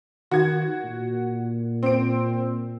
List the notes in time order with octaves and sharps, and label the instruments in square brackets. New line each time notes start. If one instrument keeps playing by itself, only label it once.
[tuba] D#3 [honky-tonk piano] F#4 G#6
[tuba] A#2
[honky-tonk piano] C4 D7